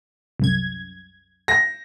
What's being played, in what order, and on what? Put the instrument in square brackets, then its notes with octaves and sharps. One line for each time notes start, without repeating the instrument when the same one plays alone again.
[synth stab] C2 F#2 G#6
[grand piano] A#6